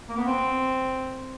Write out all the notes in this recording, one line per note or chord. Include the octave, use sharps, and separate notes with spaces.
A#3
B3
C4